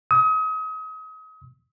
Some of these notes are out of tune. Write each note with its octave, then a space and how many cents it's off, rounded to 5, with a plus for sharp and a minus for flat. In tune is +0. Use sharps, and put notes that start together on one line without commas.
D#6 +35